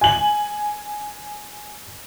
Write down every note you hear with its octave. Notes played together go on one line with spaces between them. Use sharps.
G#5 F#7